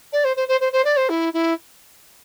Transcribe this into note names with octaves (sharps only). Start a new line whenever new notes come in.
D5
C5
C5
C5
C5
C5
D5
C5
E4
E4